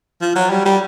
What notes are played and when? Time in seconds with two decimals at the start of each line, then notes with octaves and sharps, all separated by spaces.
0.22 F3
0.36 F#3
0.50 G3
0.66 G3